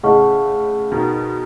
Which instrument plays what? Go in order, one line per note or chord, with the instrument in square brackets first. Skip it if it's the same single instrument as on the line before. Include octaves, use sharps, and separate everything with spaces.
[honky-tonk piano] A2 C#3 [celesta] G#4 D#5 F#5 A5 C#6
[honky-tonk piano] B2 D#3